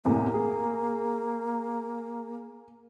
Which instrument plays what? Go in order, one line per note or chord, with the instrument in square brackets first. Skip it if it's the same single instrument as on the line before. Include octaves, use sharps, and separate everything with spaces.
[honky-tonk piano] E2 A2 C3 [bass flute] A#3
[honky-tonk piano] G#4